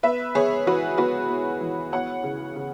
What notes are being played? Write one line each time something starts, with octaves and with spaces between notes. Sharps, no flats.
B3 B4 E5
B3 G#4 C#5
E3 F#4 B4
B3 F#4 B4
B3
E3
B3 C#5 F#5
C#3
C#3